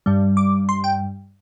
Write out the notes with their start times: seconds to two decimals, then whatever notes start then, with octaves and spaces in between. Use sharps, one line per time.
0.06 G2 G3
0.37 D6
0.69 C6
0.84 G5